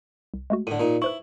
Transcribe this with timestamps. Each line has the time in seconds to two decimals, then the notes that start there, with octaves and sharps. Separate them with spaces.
0.34 C2
0.50 G#3 A3 F#4
0.67 A2 D3 D#7
0.80 A#2 D#4
1.02 E4 B4 C5 C#6